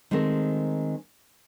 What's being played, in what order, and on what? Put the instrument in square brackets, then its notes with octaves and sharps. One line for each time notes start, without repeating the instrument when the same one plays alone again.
[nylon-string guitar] D#3 G#3 A3 C4 A#4